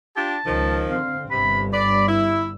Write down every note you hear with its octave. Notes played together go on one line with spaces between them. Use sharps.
D4 F4 G4 A5
C#2 D#3 F3
D3 C4 F5
G1 G2 C3 B5
D5 B5
E4 E6